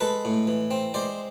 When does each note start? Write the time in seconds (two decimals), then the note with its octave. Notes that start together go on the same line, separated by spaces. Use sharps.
0.01 G#3 A4 B4
0.25 A2
0.47 E3
0.71 C4
0.94 G#3 C5 D5